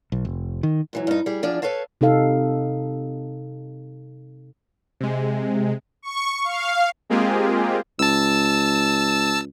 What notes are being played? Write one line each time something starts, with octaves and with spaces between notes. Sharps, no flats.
B1
F1
D#3
G#2 E3 F#3
G2 D#4
G3 G#4
E2 F3 D4 G#4 D5
A4 B4 C#5 F5 A5
C3 D#4 A4 F5
C3 G#3
C#6
F5
G#3 A#3 C4 F4 G4 G#4
C#2 A5 E6